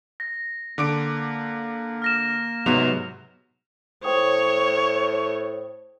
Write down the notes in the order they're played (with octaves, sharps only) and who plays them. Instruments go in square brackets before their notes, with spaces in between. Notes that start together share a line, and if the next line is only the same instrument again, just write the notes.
[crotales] A#6
[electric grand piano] D3 D6 D7 [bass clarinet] A#3
[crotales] F6 A#6 E7
[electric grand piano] G#2 F#3 B3 [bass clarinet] C3 [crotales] F7
[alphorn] A2 [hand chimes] C5 G5 D#6 [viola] C#5